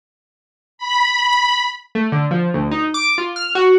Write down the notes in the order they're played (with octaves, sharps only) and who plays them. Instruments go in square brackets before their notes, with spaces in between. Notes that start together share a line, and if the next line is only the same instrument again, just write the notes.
[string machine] B5
[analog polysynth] A3
D3
F3
D2
D#4
D6
F4
F6
F#4